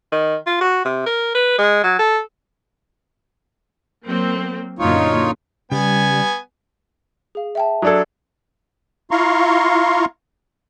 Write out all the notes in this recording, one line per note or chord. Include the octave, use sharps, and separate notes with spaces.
D#3
F4
F#4
C3
A#4
B4
G#3
F#3
A4
F#3 A#3 C4
F#2 A#2 D3 D#4 F4 C#5
C#3 G3 B3 G#5
G#4 F5
E5 G5 A5
F#3 D4 A4 D#6 G#6
E4 F4 F5 A#5 C6 C#6